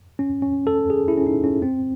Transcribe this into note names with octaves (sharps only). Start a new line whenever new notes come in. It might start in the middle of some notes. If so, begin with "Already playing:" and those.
C#4
C#4
A4
G#4
E4
C#4
D#4
C#4
C4